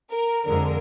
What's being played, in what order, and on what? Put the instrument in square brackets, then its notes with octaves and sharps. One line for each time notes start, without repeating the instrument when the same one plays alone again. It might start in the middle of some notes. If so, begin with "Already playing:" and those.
[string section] A#4
F2 D3 F3 G#3 A#4